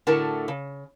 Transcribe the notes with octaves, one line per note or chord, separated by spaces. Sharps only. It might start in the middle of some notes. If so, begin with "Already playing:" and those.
A2 D3 A3 F#4 A#4 A5
C#3